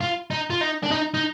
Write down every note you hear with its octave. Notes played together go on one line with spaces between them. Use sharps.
F4
D#4
F4
D#4
D4
D#4
D#4